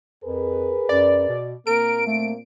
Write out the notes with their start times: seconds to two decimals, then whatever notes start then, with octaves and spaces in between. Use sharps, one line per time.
0.24 F2 G#4 A#4 B4
0.89 F#2 D5
1.29 B2
1.67 A#2 A#3 C4 A#4 D7
2.07 A3